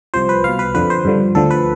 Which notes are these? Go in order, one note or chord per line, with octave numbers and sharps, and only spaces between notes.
C2 C3 F3 C5
B4
C2 B2 F5
B4
F2 D3 F3 B4
C5
G2 D3 F3
D2 D3 F3 A4
B4